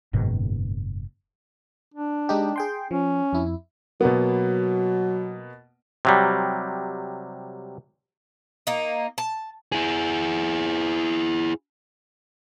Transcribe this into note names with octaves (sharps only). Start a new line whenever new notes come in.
F#1 G#2 B2 D#3
D4
G#3 D#4 G4
G#4 G5 C6
F3 C#4
F2 E4
B2 F#3 A#3 B3
C3 F#3 G3
A#3 D#4
A5
E4 G#4